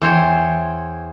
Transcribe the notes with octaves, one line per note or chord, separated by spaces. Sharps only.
E2 C5 C#5 G5